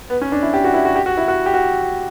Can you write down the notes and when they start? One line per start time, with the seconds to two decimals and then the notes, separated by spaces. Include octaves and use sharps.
0.10 B3
0.22 C#4
0.32 D4
0.42 E4
0.53 G4
0.64 F#4
0.74 E4
0.85 F#4
0.96 G4
1.06 F#4
1.17 E4
1.28 F#4
1.46 G4
1.54 F#4